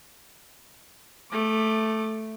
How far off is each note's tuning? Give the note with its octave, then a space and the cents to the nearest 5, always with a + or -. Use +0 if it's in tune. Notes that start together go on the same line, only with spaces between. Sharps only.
A3 +0 D6 +20